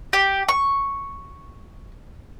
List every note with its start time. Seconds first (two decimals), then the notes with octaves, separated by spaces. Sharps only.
0.13 G4
0.49 C#6